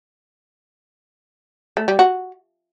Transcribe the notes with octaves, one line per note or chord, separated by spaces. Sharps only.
A3
G3
F#4